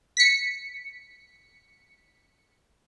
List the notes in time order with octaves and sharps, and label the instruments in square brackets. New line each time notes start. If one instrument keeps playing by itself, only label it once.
[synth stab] B6 C#7